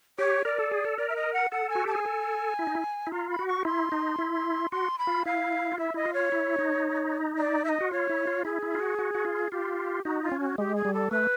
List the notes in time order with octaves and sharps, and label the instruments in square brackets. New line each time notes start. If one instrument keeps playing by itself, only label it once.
[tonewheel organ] G4 [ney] C#5
[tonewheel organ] A#4 [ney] D5
[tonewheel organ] A4
G#4
A4
[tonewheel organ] A#4 [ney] D5
[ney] E5
D#5
F#5
[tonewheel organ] A4 [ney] F#5
[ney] G#5
[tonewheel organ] F#4
[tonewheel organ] G4 [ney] A5
[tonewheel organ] G#4 [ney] G#5
[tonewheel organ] A4
E4
D#4
E4
E4
[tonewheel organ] F4 [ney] A#5
[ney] B5
[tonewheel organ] F#4
[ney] C#6
[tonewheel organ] E4 [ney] C6
[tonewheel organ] D#4
E4
[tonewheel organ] F#4 [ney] C6
[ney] B5
[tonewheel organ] F4
[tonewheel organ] E4 [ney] F5
[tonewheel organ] F4
[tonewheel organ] E4 [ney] E5
[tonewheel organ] E4 [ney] D#5
[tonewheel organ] F4
[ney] C#5
[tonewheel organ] E4
D#4
[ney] D5
E5
D#5
[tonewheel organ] F#4
[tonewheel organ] F4 [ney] C#5
[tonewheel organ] E4
F4
[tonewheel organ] E4 [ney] G#4
[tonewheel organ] E4
F4
F#4
F#4
F#4
F4
[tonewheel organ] F4 [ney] G4
[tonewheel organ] D#4 [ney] F#4
[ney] F4
[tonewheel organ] C#4
[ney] F#4
[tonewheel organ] G#3 [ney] G4
[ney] G#4
[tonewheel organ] G3
[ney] A4
[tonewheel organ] A3 [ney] B4